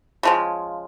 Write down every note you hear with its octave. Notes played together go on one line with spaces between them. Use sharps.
C#3 F3 G#3